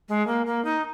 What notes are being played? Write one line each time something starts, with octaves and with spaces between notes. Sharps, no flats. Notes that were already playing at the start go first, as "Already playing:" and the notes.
G#3
A#3
A#3
D#4